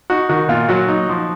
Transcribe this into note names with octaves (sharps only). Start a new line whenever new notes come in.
D#4 F#4
D#3 F#4
A#2 F4
F#3 F#4
D#4
F3